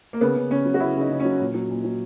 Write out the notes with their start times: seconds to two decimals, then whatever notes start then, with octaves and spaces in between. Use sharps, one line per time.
0.13 A#3
0.21 C#3 B3
0.36 C#3
0.51 C#3 C#4
0.66 F#3
0.74 F#4
0.80 C#3 E4
0.96 C#3 D#4
1.10 C#3
1.20 C#4
1.25 F#3
1.40 A#2
1.54 F#3
1.70 A#2
1.84 F#3